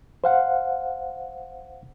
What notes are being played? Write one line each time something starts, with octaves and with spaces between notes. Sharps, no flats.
C5 F5 F#5